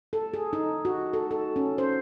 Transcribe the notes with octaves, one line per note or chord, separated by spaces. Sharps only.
A4
G#4
D#4
F#4
A4
A4
C#4
C5